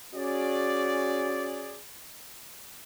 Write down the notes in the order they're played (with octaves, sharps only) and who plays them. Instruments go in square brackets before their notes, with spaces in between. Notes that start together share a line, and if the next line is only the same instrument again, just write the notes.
[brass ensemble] C#4 F#4 G#4 D5